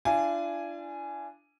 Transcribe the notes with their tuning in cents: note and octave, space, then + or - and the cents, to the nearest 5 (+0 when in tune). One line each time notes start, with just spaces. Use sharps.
D4 +0 F4 -45 G#5 +0